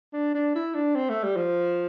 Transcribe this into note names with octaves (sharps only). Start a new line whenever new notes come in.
D4
D4
E4
D4
C4
A3
G3
F3